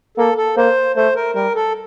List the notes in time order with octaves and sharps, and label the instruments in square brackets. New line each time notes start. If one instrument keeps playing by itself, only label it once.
[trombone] A#3 [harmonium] A4
[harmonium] A4
[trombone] A#3 [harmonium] C5
[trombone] A3 [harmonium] C5
[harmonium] A#4
[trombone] G3 [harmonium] A#4
[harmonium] A4